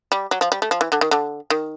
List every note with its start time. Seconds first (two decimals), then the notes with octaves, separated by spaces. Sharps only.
0.12 G3
0.31 F#3
0.41 F3
0.52 G3
0.62 A3
0.71 F3
0.81 E3
0.92 D3
1.01 D#3
1.11 D3
1.50 D#3